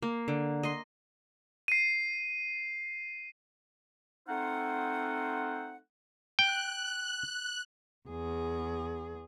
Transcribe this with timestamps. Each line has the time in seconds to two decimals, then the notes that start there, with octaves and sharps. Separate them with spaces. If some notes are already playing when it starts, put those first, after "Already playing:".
0.02 A#3
0.28 D3
0.63 D#5 C6
1.68 C7 D#7
4.28 A3 C4 D#4 F4 C5 F#5
6.39 G5 F#6
8.09 E2 G#4